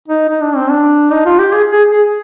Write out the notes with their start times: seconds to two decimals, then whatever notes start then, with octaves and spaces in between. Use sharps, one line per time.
0.08 D#4
0.29 D#4
0.42 D4
0.56 C4
0.70 D4
1.12 D#4
1.26 F4
1.39 G4
1.53 G#4
1.72 G#4
1.92 G#4